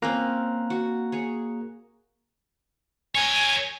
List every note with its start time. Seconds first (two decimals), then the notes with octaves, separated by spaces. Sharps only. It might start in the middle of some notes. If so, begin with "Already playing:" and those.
0.02 A#3 C4 C#4 F4 A#5 F#6
0.70 F#4
1.12 G#4 C#5
3.15 A#4 C#5 G#5